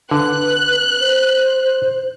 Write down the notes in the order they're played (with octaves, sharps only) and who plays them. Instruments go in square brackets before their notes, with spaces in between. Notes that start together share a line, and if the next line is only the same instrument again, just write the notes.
[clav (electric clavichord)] D3 [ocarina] B4 [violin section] F#6
[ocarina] C5